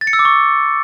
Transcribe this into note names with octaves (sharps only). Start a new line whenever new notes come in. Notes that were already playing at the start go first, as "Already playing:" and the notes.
A6
C#7
E6
D6
C#6